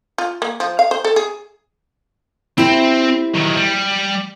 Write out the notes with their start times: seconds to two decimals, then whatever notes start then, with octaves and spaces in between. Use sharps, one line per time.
0.18 F4
0.42 A#3
0.60 F3
0.79 F5
0.91 C5
1.04 A4
1.16 G#4
2.58 C4 E4 G4 C5
3.34 D#3 F#3
3.56 G3